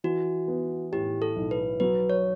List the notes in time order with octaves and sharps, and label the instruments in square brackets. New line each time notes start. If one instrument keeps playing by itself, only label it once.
[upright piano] E3 [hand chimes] F#4
[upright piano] B3
[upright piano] A2 [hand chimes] G4
[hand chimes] A4
[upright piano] B1
[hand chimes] B4
[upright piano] F#3 [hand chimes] B4
[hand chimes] C#5